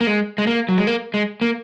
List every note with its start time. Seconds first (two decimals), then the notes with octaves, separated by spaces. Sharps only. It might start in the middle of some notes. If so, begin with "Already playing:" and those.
0.01 A#3
0.07 G#3
0.38 G#3
0.47 A#3
0.69 F#3
0.78 G#3
0.87 A#3
1.14 G#3
1.41 A#3